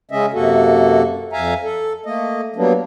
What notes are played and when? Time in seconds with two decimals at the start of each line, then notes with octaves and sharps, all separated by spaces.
0.11 C#3 G#3 C#4 D#5 E5
0.33 F#2 C3 A#3 F#4 A4
1.33 F2 E5 F5 G#5 A#5
1.63 A4
2.06 A3 A#3 D#5
2.56 F#3 G3 A#3 B3 D4